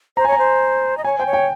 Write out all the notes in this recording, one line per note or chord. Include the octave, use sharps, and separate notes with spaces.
C5 A#5
G#5
C#5 A#5
C5
D#5
C#5 G#5
C5 G5
C#5
G5